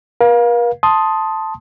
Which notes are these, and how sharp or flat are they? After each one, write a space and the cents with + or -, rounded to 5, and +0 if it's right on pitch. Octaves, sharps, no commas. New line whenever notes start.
A#4 +45 F5 +15
A5 +0 C6 +5 D#6 +5